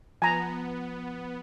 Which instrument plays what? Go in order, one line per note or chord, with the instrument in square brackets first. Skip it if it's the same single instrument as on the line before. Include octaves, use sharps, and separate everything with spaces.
[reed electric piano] F3 [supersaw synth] B3 [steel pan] G#5 A#5